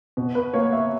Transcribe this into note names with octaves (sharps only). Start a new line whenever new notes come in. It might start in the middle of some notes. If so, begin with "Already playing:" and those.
B2
B4
A#3 C#5
E5